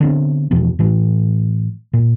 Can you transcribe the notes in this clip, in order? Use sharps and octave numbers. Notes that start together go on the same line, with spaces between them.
D3 B3 C4
E2 B2 E3 F3
A2 E3 A3
A#2